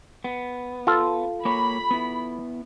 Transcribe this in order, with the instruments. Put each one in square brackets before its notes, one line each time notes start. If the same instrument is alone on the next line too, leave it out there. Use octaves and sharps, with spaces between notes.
[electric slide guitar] B3
[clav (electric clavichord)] F4 A4 F5
[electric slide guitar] A#3 C#5 [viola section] B5
[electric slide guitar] B3 E4